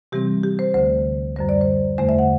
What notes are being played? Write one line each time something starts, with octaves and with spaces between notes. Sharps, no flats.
C3 E3 G3 C4 G4
G4
C5
D2 D3 A3 C5
F#2 D3 G3 C5
D5
C5
E2 D3 A3 C5
E5
F#5